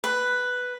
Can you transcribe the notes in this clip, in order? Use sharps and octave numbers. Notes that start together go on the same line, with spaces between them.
B4